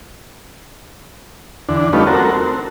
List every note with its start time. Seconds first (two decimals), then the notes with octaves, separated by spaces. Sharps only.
1.69 E2 D3 D4
1.93 G3 A3 B3 C#4 D#4 F4
2.07 C4 F#4 A4 A#4
2.31 C4